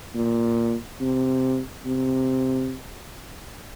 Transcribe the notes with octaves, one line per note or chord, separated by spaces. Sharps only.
A#2
C3
C3